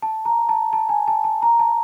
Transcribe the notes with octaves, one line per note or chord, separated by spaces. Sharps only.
A5
A#5
A5
A5
G#5
A5
A5
A#5
A5